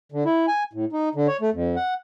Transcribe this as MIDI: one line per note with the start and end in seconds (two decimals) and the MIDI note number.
0.12 0.24 50
0.25 0.46 64
0.48 0.63 80
0.73 0.85 45
0.93 1.09 63
1.15 1.27 50
1.27 1.37 73
1.41 1.50 57
1.53 1.76 41
1.76 1.94 78